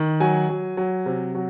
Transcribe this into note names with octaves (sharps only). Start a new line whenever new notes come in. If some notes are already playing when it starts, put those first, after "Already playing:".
Already playing: D#3
F#3 G#5
F#3
F#3
C3
F#3